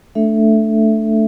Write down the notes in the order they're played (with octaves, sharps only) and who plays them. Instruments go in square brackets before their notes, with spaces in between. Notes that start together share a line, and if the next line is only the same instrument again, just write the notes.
[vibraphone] A3 D4 A4 E5